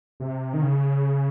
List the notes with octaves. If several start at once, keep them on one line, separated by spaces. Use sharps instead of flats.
C3
D#3
C#3